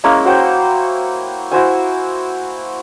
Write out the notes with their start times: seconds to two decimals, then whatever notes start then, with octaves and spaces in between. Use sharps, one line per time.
0.04 G#3 A#3 C#4 E4
0.25 F#4 C5 C#5 G5
1.52 E4 F#4 C5 G#5